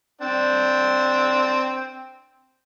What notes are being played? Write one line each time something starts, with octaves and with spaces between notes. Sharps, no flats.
C4 D4 G5